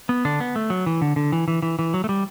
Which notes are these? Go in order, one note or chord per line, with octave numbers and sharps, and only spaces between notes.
B3
D3 D4
B3
A3
F#3
E3
D3
D3
E3
E3
E3
E3
F#3
A3
G3